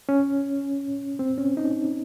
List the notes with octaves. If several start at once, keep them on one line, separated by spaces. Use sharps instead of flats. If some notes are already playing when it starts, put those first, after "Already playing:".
C#4
C4
C#4
D#4